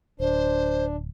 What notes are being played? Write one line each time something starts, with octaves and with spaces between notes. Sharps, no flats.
D1 D4 C5